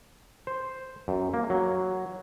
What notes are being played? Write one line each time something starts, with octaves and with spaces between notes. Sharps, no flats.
C5
F#2
A#3
F#3